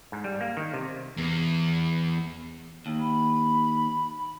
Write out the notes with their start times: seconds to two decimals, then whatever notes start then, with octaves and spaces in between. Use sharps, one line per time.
0.12 G#2
0.24 G3
0.41 A#3
0.57 D#3
0.74 C3
1.18 E2
2.86 D#2
3.01 B5